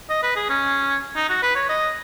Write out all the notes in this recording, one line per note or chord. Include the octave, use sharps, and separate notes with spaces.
D#5
B4
G#4
C#4
D#4
F#4
B4
C#5
D#5